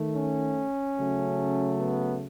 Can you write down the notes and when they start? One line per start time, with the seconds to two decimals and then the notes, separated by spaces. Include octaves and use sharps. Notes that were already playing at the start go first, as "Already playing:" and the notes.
Already playing: D#3 A3
0.15 C#4
0.98 C#3 F#3 A3
1.80 B3